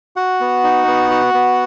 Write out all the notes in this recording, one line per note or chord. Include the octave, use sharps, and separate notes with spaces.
F#4 F#5
B3
D#4
B3
F#4
B3